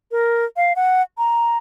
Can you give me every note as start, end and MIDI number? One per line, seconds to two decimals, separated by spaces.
0.11 0.45 70
0.57 0.73 77
0.76 1.02 78
1.18 1.58 82